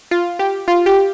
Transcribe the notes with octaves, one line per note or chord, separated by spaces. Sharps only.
F4
G4
F4
G4